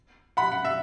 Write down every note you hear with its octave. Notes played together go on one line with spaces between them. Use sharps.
F#5 B5
F#5
E5